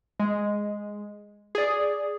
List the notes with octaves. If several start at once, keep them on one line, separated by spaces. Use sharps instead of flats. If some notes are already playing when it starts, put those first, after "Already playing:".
G#3
G#4 D5